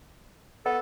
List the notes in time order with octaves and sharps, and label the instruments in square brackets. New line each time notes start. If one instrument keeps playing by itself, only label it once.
[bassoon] B3 [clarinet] A4